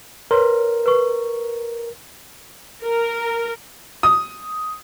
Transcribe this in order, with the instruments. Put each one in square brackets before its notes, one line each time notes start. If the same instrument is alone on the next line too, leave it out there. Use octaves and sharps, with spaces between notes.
[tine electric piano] A#4 [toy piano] B4 C#5 C6
[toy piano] B4 C#6
[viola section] A#4
[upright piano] D#6